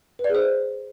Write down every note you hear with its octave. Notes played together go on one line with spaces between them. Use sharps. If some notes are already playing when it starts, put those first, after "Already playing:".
B4
D5
G#4
C5